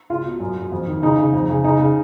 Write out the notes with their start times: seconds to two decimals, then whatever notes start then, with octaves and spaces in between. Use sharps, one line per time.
0.10 C#2 F4
0.25 B2
0.40 F#2
0.56 F#2
0.72 F2
0.87 D#3
1.02 C#3 D#4
1.18 C#3
1.33 F2
1.49 C#3
1.64 C#3 D#4
1.79 C#3